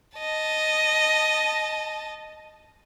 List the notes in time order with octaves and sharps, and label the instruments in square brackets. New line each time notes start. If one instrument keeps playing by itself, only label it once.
[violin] D#5 A5